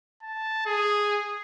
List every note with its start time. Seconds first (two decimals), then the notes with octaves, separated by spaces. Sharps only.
0.23 A5
0.66 G#4